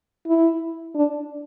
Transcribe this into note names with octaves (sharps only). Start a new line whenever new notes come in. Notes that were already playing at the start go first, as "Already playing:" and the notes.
E4
D4